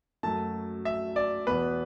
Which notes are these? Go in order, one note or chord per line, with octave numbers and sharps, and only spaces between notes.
F#2 F#3 A3 A5
E5
D5
E2 B2 B3 B4